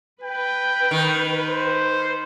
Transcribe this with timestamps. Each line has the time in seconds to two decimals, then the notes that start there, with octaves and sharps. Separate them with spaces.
0.24 B4 G5
0.91 D#3
1.49 C5